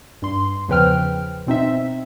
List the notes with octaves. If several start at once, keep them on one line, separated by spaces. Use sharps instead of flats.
G2 C6
E2 C#3 F3 B4 G5 F6
B2 C4 D#4 E5